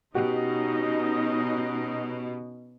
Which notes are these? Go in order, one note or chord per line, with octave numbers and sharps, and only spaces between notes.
B2 C#4 D#4 F#4 G4 D#5